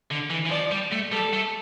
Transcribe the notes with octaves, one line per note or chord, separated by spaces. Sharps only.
D3
E3
E3
F3 D5
G3
A3
G3 A4
A3